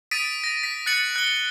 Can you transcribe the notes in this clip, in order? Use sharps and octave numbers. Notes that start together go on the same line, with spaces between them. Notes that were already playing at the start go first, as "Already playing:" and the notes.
D#6 A6 B6 D7 D#7
A#6
B6
F#6 A6 C#7 F#7
F#6 G7